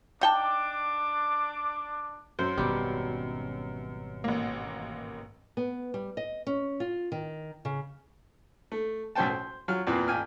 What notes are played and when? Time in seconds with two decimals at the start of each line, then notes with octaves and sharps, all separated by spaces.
0.21 D4 D#4 G5 A5 D6
2.39 F#2 C5
2.58 G#1 B2 G3 G4
4.24 A1 A#3
5.57 B3
5.94 G3
6.17 D#5
6.47 C#4
6.80 F4
7.12 D#3
7.65 C#3
8.72 A3
9.15 B1 A2 C#4 C5 G5 A5
9.30 C5
9.68 F#3 F4 F6
9.87 E2 A#2 E3 C4
10.08 A1 G5 G#5 F6